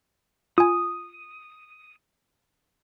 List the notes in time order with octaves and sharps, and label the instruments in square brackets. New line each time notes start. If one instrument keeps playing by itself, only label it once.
[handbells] F4 G#5 [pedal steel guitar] D#6